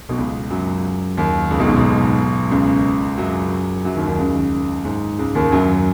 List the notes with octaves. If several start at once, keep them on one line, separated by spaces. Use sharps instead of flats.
B1 B2
C#2 C#3
F#2 F#3
D#2 D#3
C#2 C#3
B1 B2
G#2
B1 B2
C#2 C#3
F#2 F#3
F#2 F#3
D#2 D#3
D#2 D#3
C#2 C#3
G#2
C#2 C#3
D#2 D#3
F#2 F#3